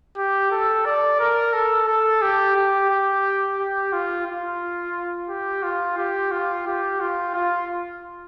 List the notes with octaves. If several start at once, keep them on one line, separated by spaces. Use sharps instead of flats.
G4
A4
D5
A#4
A4
A4
G4
G4
G4
G4
F4
F4
G4
F4
G4
F4
G4
F4
F4